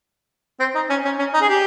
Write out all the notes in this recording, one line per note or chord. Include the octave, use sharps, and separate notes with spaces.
C4
D#4
C#4
C#4
C#4
D#4
G#4
G4